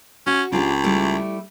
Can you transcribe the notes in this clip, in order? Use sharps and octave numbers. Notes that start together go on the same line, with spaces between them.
C#4 F#4
C#2 D4 F4 G4
G3 A3 E4